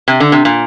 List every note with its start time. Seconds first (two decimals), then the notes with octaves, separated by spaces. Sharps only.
0.08 C3
0.20 D3
0.32 C3
0.45 A#2